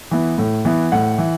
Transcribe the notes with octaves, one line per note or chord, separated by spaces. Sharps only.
E3 B3
A2
E3 B3
A2 F#5
E3